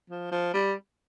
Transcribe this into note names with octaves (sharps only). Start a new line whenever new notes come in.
F3
F3
G3